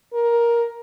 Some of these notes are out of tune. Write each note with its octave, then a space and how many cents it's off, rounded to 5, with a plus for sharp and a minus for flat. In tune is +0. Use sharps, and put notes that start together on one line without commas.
A#4 +10